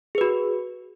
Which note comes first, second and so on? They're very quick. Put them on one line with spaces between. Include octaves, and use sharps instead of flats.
G#4 B4 F#4